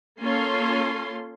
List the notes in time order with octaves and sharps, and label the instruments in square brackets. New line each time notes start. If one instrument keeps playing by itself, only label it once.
[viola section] A#3 C#4 F4 A4 C6